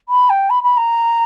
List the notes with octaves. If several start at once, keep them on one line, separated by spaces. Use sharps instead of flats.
B5
G5
B5
B5
A#5